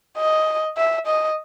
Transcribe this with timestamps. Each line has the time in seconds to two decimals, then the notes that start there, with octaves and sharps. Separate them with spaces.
0.17 D#5
0.77 E5
1.07 D#5